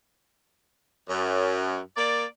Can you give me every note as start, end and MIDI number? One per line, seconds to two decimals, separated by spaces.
1.09 1.79 42
1.97 2.25 58
1.97 2.25 74